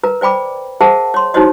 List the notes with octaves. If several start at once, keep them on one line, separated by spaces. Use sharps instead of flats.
A#4 B4 A#5
C5 D5 G5 B5 D6
G#4 A#4 C5 E5 F#5 A5
C#5 C6
D#4 E4 F#4 C5 C#5 D#5